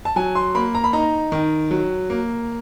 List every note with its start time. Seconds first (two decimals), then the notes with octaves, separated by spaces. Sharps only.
0.05 A5
0.16 F#3 G#5
0.35 C6
0.55 A#3 B5
0.75 A#5
0.84 B5
0.93 D#4 A#5
1.32 D#3
1.71 F#3
2.10 A#3